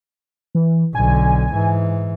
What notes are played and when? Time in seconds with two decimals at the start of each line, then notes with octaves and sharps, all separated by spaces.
0.55 E3
0.95 B1 D3 G#5
1.53 G#2 E3